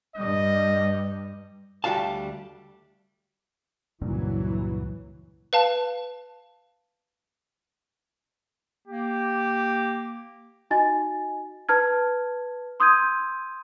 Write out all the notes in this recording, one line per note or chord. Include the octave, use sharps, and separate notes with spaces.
G2 G3 D#5
D2 G3 F#4 F5 A5
C#2 G2 A#2 E3 F#3
B4 F5 A5
A#3 G4
D#4 F#4 D#5 G#5 A6
B4 A5 F6 G#6
C6 D#6 E6 G6 G#6 D#7